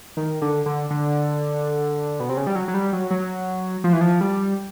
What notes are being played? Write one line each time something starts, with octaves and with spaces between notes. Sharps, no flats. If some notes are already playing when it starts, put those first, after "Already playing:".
D#3
D3
D3
D3
B2
C3
C#3
G3
F#3
F#3
G3
F#3
F#3
F3
E3
F3
G3